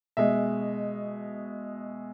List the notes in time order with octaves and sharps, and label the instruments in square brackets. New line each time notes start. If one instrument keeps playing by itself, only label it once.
[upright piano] B2 G#3 E5